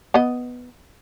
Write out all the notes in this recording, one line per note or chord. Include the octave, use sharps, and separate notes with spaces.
B3 D#5